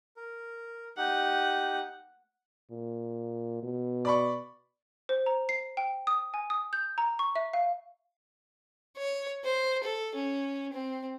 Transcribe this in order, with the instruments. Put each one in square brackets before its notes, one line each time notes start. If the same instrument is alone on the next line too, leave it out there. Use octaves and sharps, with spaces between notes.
[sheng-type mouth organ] A#4
[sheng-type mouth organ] D#4 G4 [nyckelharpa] F#5
[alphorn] A#2
B2
[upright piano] D5 B5 C#6
[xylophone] C5
A#5
C7
G5
D#6
G#5
D#6
G6
A#5
C#6
E5
F5
[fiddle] C#5
C5
A4
C#4
C4